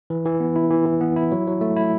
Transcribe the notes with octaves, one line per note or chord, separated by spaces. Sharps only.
E3
E3
B3
E4
E3
E3
B3
E4
F#3
F#3
A3
E4